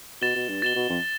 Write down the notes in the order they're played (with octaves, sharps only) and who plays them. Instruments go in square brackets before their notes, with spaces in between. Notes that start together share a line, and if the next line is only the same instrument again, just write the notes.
[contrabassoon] B2 [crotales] A6 E7 G7
[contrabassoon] B2
G2
[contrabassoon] B2 [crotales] A6 E7 G7
[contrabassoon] B2
F2